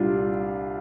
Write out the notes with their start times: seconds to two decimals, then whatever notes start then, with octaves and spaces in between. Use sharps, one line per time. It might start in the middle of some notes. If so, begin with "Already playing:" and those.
Already playing: C2 A#2 G3 D4 F4